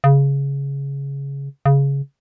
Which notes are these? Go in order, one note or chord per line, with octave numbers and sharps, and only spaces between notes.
C#3
C#3